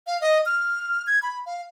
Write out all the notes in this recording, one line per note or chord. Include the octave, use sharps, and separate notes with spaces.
F5
D#5
F6
G#6
B5
F5